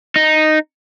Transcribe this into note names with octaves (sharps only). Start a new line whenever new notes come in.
D#4